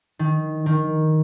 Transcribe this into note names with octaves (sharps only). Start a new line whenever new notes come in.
D#3
D#3